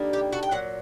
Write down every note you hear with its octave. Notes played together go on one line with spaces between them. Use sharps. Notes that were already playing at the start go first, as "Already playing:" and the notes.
Already playing: D3 G3 A#3 D#4
G4
F#4 A4
G5
A#2 F#3 F#5